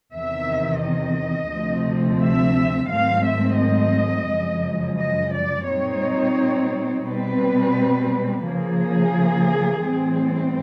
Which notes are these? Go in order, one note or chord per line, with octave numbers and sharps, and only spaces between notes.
E2 C3 D#3 E5
D#5
D2 C3 F3 A3 C4
E5
G#2 D#3 F#3 A3 C4 F5
E5
D#5
F#2 C#3 F3 G#3
D#5
D5
A#2 G3 C4 D#4 C#5
B2 G3 C4 B4
C#3 F3 A#3 G#4
A2 E3 G3 C4